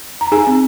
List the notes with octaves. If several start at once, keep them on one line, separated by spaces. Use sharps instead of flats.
A#5
D#4 G#4 G#5
C4